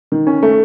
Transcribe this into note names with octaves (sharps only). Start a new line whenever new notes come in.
D#3
C#4
A3